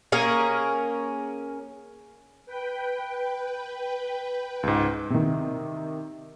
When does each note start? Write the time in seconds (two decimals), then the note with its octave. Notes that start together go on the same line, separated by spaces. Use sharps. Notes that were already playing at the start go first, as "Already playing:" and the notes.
0.12 A#3 C#4 G#4 A#4
2.46 B4 G5
4.63 C#2 G#2
5.10 C3 D#3